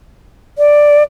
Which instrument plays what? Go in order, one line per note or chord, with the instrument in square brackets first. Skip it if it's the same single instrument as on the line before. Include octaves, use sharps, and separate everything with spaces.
[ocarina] D5